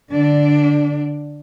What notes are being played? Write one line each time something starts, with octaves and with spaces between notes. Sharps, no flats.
D3 D4